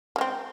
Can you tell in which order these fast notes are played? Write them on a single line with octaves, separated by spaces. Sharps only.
C#3 G#3 C4